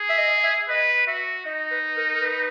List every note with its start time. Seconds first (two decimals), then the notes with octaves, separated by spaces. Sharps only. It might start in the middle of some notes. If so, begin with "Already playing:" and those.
Already playing: G#4
0.10 E5
0.18 D#5
0.43 E5
0.69 B4 D#5
1.07 F#4 E5
1.45 D#4 D#5
1.71 B4
1.96 A#4
2.13 A#4
2.22 B4